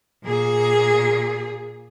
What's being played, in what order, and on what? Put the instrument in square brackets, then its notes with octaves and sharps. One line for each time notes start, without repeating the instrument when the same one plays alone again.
[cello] A#2 G#4